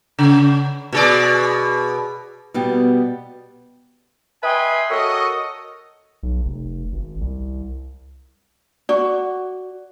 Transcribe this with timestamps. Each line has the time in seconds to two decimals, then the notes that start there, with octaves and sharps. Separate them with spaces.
0.19 C#3
0.93 B2 G#4 D5
2.54 B2 G3 B3
4.44 B4 D#5 E5 G5 G#5 C6
4.90 F#4 A4 A#4 C#5 D#5
6.23 B1
6.45 F1
6.92 G#1
7.21 C2
8.89 F#4 D5